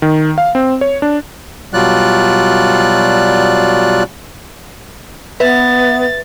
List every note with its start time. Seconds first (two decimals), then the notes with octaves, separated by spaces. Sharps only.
0.02 D#3
0.38 F5
0.55 C4
0.81 C#5
1.02 D4
1.74 B2 F#3 G3 F4 D5 F#6
5.40 B3 B4 E5 A6